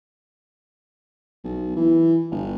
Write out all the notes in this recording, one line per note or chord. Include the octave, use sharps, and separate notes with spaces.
B1
E3
G1